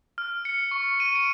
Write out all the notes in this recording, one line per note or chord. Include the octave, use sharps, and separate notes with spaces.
F6
C#7
C#6
D#7
D7